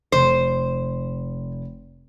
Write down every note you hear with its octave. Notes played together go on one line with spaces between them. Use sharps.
F1 C5